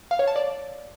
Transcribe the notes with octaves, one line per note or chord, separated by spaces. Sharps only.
F5
C#5
A5
D5